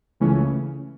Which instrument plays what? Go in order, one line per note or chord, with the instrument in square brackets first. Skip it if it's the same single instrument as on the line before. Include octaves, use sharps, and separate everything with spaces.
[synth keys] C#2 C#3 E3 A3 C#4